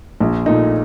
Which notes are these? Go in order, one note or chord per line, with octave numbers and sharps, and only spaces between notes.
A#1
A#2 A3 D#4